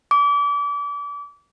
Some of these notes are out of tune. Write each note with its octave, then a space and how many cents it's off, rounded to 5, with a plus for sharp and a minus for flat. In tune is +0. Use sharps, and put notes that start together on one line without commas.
D6 -30